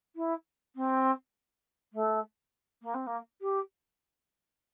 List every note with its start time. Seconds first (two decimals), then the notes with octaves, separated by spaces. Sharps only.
0.15 E4
0.75 C4
1.93 A3
2.82 A#3
2.94 C4
3.06 A#3
3.41 G4